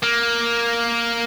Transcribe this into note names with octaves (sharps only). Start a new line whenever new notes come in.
A#3